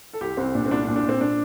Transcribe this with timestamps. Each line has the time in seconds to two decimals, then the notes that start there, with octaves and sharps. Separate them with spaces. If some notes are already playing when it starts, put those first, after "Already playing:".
0.13 A4
0.21 C2 G4
0.37 C2 C4
0.55 A#2 D4
0.66 C4
0.71 C2 D4
0.84 D4
0.88 A#2
0.96 D4
1.05 A#2 C4
1.21 D4